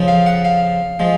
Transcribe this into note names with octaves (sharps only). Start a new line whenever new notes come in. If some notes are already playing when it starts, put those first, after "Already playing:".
Already playing: F2 C#3 F3
F5
F#5
F5
F3 G#3